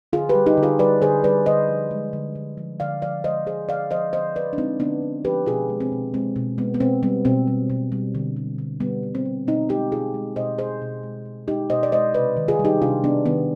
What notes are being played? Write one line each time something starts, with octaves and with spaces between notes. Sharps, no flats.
D3 F4 G#4
G4 B4
G3
D#4 G4
D3
F4 G#4
G3 B4 D5
D3 G#4 C5
G3 B4 D5
D3 C5 D#5
F3
G#3
D3
D3
F3
D3 D5 F5
F3 D5 F5
G#3 C5 D#5
D3 G#4 C5
D3 D5 F5
F3 C5 D#5
D3 C5 D#5
F3 B4 D5
D4
G#3 C4 D#4
D3 B3 D4
D3
F3 G4 B4
B2 F4 G#4
G#3
C4
B2
G#3 C4
B2
G#3 B3
B3
B2 C4
G3 B3
B2 C4
G3
B2
G3
D3
G3
D3
G3 B3
D3
C4
G3
B2 C4 D#4
G#3 D#4 G4
B2 F4 G#4
G#3
B2 C5 D#5
G#3 G#4 C5
B2
G#3
B2
G#3 D#4 G4
B2 C5 D#5
D5
G#3 C5 D#5
C3 B4 D5
D#3
F4 G#4
G3
D#4 G4
C3 D4 F4
C3 B3 D4
D#3 B3